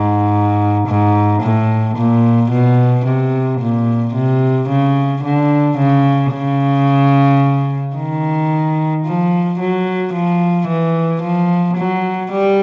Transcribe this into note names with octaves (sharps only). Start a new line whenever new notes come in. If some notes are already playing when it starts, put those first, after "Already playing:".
Already playing: G#2
G#2
A2
A#2
B2
C3
A#2
C3
C#3
D3
C#3
C#3
D#3
F3
F#3
F3
E3
F3
F#3
G3